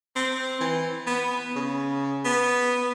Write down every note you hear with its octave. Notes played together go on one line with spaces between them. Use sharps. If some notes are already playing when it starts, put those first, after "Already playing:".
C4
E3
B3
C#3
B3